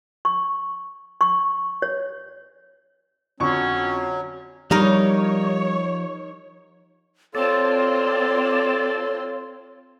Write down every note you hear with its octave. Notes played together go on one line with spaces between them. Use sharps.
C#6
C#6
C#5
F2 D3 F#3 C#4 C#6
F3 G3 D#4 G4 A#4 C#5 A#5
C4 F4 A4 C#5 D5 A5 C6